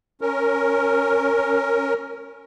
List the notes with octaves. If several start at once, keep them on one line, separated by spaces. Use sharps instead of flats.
C#4 A#4